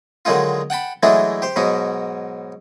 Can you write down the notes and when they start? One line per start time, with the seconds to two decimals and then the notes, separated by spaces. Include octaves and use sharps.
0.25 D3 D#3 F#3 G#3 D#4 F4
0.70 F#5 G5 A5 B5
1.03 E3 F#3 G#3 A3 D4 D#4
1.42 G4 C5
1.56 G#2 B2 F#3 D#4